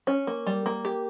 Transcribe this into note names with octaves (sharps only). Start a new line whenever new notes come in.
C#4
A#3
G3
A#3
G4